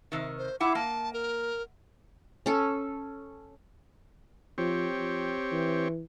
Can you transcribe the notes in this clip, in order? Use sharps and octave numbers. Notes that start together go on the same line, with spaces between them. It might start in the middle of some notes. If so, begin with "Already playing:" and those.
C3 D#3
C5
E4 F#5 D6
A#3 A5
A#4
C#4 A4
F3 C4 G4 C#5
F3
E3